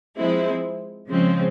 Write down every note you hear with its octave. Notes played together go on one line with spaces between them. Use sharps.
F3 G#3 C4 E4
C#3 F3 G#3 C4